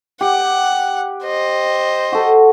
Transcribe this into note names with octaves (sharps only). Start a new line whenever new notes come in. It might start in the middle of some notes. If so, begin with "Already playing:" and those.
G4 F#5
C5 D#5
F#4 A4